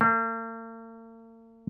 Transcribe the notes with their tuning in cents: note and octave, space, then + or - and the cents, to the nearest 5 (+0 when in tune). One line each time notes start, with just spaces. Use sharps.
A#3 -45